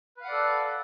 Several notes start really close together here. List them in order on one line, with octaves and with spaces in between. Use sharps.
B4 F5 F#5 D5 A4